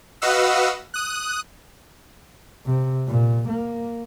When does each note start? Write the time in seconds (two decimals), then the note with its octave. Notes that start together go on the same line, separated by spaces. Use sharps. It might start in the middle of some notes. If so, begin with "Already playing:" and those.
0.22 F#4 B4 D#5 F5 F#5 E6
0.94 D#6 F#6
2.66 C3
3.08 A#2
3.49 A#3